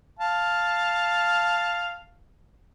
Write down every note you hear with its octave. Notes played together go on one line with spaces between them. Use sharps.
F5 A5